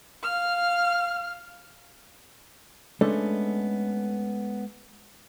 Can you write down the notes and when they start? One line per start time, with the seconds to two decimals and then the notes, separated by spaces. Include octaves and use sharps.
0.23 F5 F6
3.01 G#3 A3 B3 C#4 D4 A4